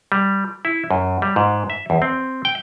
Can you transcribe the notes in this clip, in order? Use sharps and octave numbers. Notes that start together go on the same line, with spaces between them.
G3
E4
F#2
G3
G#2
E5
E2
C4
G5